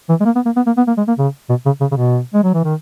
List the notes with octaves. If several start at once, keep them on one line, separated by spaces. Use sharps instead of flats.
E3
G#3
A#3
B3
A#3
B3
A#3
B3
A#3
G#3
A#3
C#3
B2
C#3
C#3
C#3
B2
G#3
F#3
E3
D#3